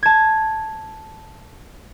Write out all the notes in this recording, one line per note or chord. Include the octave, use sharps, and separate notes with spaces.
A5 G#6